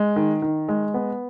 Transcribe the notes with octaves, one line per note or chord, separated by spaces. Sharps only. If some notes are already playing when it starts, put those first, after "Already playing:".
Already playing: G#3
D#3
D#3
G#3
B3